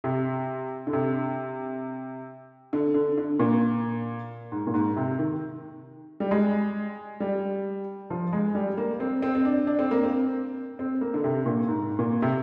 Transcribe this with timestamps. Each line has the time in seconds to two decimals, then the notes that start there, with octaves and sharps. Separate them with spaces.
0.04 C3
0.87 D3
0.93 C3
2.73 D3
2.94 D3
3.18 D3
3.40 A#2
4.52 G#2
4.67 A#2
4.74 G#2
4.96 C3
5.19 D#3
6.20 G3
6.31 G#3
7.20 G3
8.10 F3
8.33 G#3
8.55 G3
8.77 A#3
9.00 C4
9.22 C4
9.35 C4
9.45 D4
9.67 D4
9.79 C4
9.91 A#3
10.03 C4
10.79 C4
11.01 A#3
11.14 D3
11.24 C3
11.46 A#2
11.69 G#2
11.99 A#2
12.22 C3